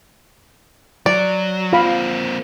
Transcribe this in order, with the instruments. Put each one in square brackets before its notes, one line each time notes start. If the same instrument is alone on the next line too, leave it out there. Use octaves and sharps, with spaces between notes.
[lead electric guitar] F#3 [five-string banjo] D5
[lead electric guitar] A#3 C4 [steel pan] F4 F5 B5